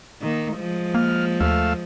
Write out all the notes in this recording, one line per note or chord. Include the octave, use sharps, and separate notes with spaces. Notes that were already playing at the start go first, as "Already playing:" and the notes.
D#3 A#3
F3 G#3
A#3 F6
D#2 A3 F5 E6